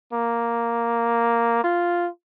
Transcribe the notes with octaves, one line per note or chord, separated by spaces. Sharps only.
A#3
F4